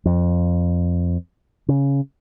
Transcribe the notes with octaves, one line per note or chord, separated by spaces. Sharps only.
F2
C#3